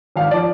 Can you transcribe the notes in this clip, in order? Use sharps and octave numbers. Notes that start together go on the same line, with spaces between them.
G#1 F5
F3 D5